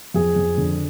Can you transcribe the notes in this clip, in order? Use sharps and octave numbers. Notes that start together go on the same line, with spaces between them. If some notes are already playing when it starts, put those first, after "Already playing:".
F2 G#4
F2
D3